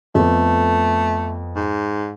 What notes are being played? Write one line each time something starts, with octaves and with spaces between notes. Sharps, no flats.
F2 A3 B3
G#2